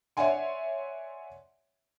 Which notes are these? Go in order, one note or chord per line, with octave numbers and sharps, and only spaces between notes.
C#5 D5 E5 F#5 G#5 C6